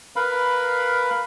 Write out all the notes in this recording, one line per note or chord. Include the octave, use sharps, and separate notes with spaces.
A#4 B4 F5 B5